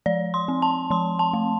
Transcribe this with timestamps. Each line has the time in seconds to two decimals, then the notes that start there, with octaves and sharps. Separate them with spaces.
0.06 F3 D5
0.34 C6
0.48 C4
0.62 A5
0.91 F3 C6
1.19 A5
1.33 A3